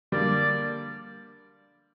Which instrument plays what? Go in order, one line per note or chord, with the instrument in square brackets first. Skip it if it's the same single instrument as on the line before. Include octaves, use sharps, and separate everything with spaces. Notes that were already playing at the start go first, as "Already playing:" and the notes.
[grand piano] D3 G3 A#3 [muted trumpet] D5